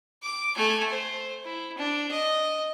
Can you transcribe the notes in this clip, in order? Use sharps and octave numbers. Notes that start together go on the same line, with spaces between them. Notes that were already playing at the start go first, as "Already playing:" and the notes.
D6
A3 G#5
C5
E4
D4
D#5